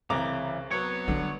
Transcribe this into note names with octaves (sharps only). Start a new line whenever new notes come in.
C2 C#3 E3 A#5 D6
F#3 B3 C#5
D3 G3 C#4